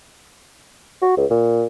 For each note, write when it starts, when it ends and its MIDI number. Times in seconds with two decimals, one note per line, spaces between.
1.02 1.13 66
1.17 1.25 37
1.30 1.66 46